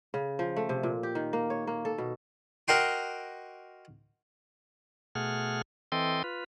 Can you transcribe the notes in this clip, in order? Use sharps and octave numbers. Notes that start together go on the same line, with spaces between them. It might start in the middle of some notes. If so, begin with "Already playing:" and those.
C#3
F3
A3
C3
A#2
G4
D#3
A#3
C#5
A#3
A4
B2
F#4 A#4 D#5 G5 C6 D6
B2 A3 G#4 F#5 F6
E3 C4 A4 D#5 G5 C6
F4 B4